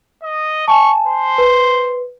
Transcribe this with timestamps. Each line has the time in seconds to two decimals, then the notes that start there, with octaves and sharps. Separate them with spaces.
0.23 D#5
0.68 G#5 A5 C#6
1.07 C5
1.38 B4